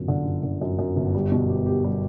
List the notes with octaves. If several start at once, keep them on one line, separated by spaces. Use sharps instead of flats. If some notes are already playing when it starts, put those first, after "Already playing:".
Already playing: G1 F#2
D3
G1
D3
F#2
F#2
G1
G3
B2
G4
G4
G3